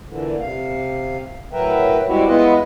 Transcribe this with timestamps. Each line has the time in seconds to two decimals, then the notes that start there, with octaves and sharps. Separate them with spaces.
0.09 A#2 D3 E3
0.40 C3 F5
1.53 A2 F#3 A#4 B4 E5 G5
2.07 G3 G#3 C4 E4 F#4 G4
2.27 G#3 B3 E4 F4 B4 D#5